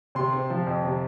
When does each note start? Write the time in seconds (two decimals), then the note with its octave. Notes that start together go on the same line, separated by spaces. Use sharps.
0.15 C3 C6
0.33 C4
0.50 F3
0.66 F2
0.83 C3